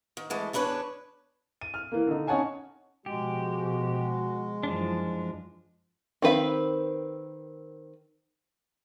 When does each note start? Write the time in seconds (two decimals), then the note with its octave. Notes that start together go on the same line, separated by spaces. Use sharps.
0.17 D#3
0.30 E3 G#3 A3
0.53 E2 C#4 D4 B4 C#5
1.61 D#7
1.74 F6
1.92 E3 A#3
2.07 D3 D#4
2.27 C#4 D#4 C#5 F#5 G#5 A5
3.06 B2 F3 G#3 F#4 G4
4.63 F#2 E3 F3 D4
6.22 D#3 C4 B4 F5